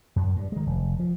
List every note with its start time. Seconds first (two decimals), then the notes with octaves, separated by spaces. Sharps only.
0.16 F#2
0.36 G2
0.52 D#3 G#3
0.67 F1
0.99 F3